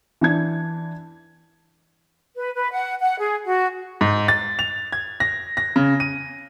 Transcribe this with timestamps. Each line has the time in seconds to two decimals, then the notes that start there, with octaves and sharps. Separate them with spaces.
0.21 E3 D4 G#6
2.36 B4
2.55 B4
2.71 F#5
3.00 F#5
3.19 G#4
3.45 F#4
4.01 G#2
4.28 A6
4.59 F7
4.92 G#6
5.20 A#6
5.57 A#6
5.76 C#3
6.00 D#7